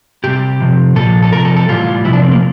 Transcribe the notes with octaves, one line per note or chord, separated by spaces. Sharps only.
C3 G3 G4
C3 F3
A#2 F3 A4
A4
C3 F3 A#4
A4
A4
A2 E3 G3 F4
C3 F3 E4
D4
C4
A#3